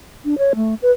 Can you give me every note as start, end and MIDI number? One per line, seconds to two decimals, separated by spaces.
0.25 0.38 62
0.38 0.53 73
0.55 0.74 57
0.82 0.91 71